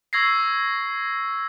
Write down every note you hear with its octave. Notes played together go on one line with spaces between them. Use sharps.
C#6 E6 G#6 A#6 C7